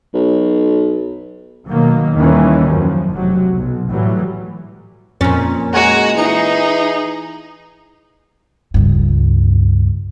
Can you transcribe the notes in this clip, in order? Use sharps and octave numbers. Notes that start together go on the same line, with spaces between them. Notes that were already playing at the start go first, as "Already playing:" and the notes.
B1
B2 D#3 F#3 A#3
D#2 D#3 E3 G3 C#4
F#2 F3
F1 C3 F#3
B1
A2 E3 F#3 G3
F2 A#2 C#4
G#3 F#4 F#5 G#5 A#5
E3 D#4 G#4 C#7
C#2 G2